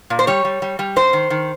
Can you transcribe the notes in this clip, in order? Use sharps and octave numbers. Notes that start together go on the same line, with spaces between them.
A#2
C5
G3 C#5
G3
G3
G3
G#2 C5
D#3
D#3